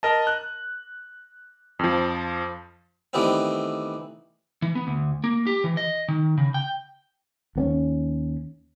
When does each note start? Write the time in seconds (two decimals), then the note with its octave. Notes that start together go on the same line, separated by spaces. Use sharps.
0.03 A#4 D#5 A5
0.27 F#6
1.79 F2 F3
3.13 D#3 E3 G3 A3 B3 C4
4.62 E3
4.75 B3
4.87 D2
5.24 A#3
5.47 G4
5.64 E3
5.77 D#5
6.08 D#3
6.38 C#3
6.54 G5
7.56 D#2 B3 C#4